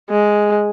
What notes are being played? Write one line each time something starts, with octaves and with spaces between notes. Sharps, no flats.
G#3